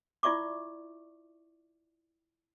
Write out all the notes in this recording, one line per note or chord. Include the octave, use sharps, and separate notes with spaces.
E4 F4 D5 E5 C#6 D6